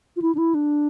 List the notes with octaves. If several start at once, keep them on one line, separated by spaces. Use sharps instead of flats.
F4
E4
D4
E4
D4